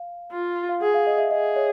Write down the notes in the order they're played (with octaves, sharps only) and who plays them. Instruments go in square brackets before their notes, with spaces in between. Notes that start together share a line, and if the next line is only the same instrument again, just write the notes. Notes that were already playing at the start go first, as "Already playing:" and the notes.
Already playing: [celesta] F5
[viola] F4
[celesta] F5
[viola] G#4 [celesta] F#5
[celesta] F5
D#5
E5
[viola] G#4 [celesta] D#5
[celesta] C#5